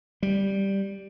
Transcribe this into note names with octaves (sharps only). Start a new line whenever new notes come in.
G3